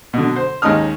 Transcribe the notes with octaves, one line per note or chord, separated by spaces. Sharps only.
B2 D3
C5
D#2 G#3 C#4 D#4 D#6 F6